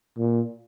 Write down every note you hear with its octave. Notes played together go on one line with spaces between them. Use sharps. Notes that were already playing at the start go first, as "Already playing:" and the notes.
A#2